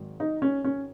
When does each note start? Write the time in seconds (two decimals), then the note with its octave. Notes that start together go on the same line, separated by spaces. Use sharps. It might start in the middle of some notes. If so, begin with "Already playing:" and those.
Already playing: G#1 G#2 D#3 F#3
0.20 D#4
0.42 C#4
0.64 C#4